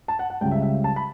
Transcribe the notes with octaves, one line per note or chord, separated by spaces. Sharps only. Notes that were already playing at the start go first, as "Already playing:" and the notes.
A5
F#5
F#5
C#2 C#3 G3 G5
E5
E5
A5
B5